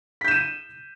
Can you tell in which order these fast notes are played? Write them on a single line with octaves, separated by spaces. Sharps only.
B6 G6 E7 D#7